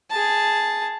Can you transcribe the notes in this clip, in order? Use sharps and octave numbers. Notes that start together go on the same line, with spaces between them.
G#4 A5